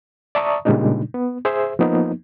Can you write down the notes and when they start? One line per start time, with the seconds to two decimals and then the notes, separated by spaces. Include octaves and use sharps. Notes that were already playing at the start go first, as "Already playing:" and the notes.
0.35 D5 E5 A5 A#5 C#6 D#6
0.65 A#2 C#3 G3 G#3 D4 D#4
1.14 B3
1.45 G#4 C5 E5
1.79 F3 A#3 B3 D#4